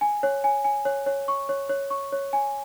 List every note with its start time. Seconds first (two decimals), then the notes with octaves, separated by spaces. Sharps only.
0.01 G#5
0.23 C#5
0.44 G#5
0.64 G#5
0.85 C#5
1.06 C#5
1.28 C#6
1.49 C#5
1.69 C#5
1.90 C#6
2.12 C#5
2.33 G#5